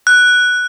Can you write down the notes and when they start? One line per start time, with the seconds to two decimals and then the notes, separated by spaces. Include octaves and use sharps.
0.07 F#6